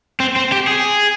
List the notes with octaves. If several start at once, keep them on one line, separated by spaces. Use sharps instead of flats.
C4
C4
G4
G#4